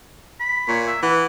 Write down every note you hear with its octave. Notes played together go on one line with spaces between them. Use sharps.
B5
A#2 C#5
E5
E3 F#5